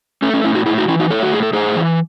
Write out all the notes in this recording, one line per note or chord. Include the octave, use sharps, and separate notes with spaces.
A3 C#4
C#4
A2 C#4 E4
D#4 F#4
A2 E4 G#4
D#4 F#4
E3 C#4 E4
D#4 F#4
A3 A4 C#5
F#4
A2 G#4
A4
A2 G#4 C5
E3